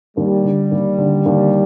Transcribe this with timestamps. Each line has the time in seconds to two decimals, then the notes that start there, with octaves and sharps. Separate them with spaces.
0.17 D#2 G3
0.44 D3
0.71 D#2
0.98 D3
1.26 D#2